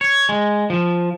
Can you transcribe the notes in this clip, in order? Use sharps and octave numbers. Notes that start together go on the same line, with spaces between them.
C#5
G#3
F3